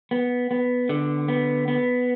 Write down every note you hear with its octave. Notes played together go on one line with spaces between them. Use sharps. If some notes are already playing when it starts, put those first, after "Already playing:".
B3
B3
D3
B3
B3